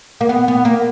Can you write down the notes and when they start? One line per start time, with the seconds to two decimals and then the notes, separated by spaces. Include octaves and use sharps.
0.21 A#3
0.29 B3
0.48 B3
0.65 A#3